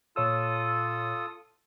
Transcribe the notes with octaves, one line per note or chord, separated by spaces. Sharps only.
A#2 F4 A4 C#5 D#6 E6